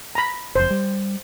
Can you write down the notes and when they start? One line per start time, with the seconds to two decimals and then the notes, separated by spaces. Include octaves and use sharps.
0.15 A#5 B5
0.56 F#1 F2 C5
0.71 G3